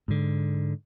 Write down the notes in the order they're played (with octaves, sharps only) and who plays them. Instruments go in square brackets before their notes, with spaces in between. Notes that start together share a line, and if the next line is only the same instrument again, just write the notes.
[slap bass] G#2 D3